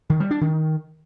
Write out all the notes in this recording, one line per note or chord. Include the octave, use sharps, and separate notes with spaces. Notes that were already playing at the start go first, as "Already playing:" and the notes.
D#3
G3
D4
D#3